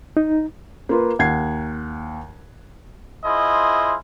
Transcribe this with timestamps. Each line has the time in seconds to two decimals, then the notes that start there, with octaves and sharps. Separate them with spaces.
0.17 D#4
0.89 A#3 F4 B4
1.19 D#2 F#5 G#6 C7
3.25 E4 F4 G#4 C5 D#5